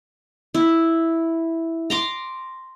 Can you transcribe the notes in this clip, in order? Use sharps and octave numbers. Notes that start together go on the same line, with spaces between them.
E4
A#5 C6 D6